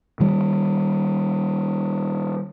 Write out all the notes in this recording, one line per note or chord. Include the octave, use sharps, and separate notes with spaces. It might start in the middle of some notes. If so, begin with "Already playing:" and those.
D#3 G3